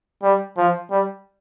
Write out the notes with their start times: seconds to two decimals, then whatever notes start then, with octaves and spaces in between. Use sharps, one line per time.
0.23 G3
0.58 F3
0.91 G3